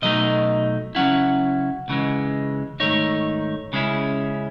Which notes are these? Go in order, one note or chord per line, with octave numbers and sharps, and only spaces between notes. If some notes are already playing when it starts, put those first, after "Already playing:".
B2 F#3 A3 D#4 D#5
C#3 F#3 A3 C#4 E4 F#5
C#2 C#3 E3 G#3
G#2 D#3 A3 D#4 C#5
C#3 G#3 C#4 E4